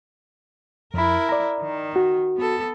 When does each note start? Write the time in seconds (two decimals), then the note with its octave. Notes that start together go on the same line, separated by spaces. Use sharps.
0.94 F2 E4 A#4 B5
1.29 D5 A#5
1.61 D#3
1.96 F#4
2.37 B3 A4